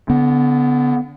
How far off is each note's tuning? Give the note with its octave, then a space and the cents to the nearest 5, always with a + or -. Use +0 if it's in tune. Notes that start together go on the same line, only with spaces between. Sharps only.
D3 -30 B3 +10